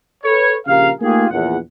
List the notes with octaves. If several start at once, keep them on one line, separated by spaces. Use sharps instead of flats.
A4 B4 C#5
A#1 C#3 G4 A#4 F5
A3 A#3 D#4 F4 G4 G#4
A#1 E2 F#5